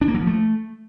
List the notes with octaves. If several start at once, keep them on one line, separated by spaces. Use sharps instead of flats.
D4
A#3
F#3
F3
A3